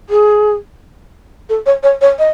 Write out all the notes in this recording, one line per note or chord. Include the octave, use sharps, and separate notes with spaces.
G#4
A4
C#5
C#5
C#5
D#5